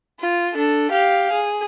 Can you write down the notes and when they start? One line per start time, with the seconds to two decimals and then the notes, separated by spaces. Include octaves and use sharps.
0.20 F4
0.54 D4 A4
0.91 G4 F5
1.32 G#4